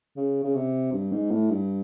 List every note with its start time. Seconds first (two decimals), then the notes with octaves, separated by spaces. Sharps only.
0.17 C#3
0.44 C#3
0.55 C3
0.93 G2
1.12 G#2
1.30 A2
1.51 G2